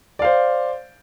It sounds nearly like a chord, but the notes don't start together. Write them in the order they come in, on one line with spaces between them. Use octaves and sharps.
D5 F5 C5